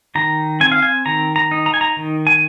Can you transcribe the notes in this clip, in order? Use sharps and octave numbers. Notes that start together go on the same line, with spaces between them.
D#3 A#5
C4 G#5
F5
G#5
D#3 A#5
A#5
D#4
A#5
G#5
A#5
D#3
G#5